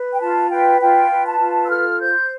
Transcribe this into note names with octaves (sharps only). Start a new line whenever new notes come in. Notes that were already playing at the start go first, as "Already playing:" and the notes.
Already playing: B4
G5
F4 A5
B4 G5
F4 G5
B4
A5
F4
E6
A4 F6
C5 G6